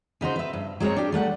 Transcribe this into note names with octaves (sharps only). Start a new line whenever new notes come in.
C#3 D#4 F#4 C5
B4 E5
G2
F#3 G#3 C4 A#4 C#5
D4 G4
G3 A3 F5 F#5